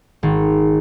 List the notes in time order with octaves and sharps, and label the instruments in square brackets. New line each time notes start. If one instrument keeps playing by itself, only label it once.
[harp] G#1